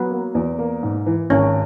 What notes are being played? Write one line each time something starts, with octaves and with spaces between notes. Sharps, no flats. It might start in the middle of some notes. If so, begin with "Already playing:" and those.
Already playing: F#3 B3
A#3
E2
A#3
G#2
E3
G#1 C#4